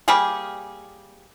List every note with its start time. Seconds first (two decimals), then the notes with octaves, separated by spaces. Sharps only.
0.08 G3 A#3 G4 G#4